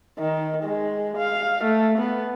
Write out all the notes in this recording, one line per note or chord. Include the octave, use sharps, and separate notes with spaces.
D#3
G#3
F5
A3
B3